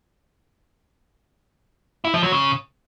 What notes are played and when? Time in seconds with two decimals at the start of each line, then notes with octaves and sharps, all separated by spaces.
2.05 E4
2.14 F3
2.23 F#3
2.32 C#3